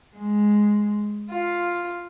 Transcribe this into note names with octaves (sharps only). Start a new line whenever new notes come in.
G#3
F4